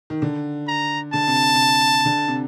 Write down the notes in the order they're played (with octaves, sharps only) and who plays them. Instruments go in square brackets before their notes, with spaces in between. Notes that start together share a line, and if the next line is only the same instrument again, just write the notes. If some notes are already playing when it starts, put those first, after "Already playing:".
[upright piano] D#3
D3
[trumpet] A#5
[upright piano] D3 [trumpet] A5
[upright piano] C3
C3
D3
C3